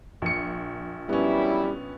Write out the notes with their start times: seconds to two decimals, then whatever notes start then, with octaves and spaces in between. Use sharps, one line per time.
0.22 A#1 C#7
1.09 F#2 E3 G3 B3 C#4 E4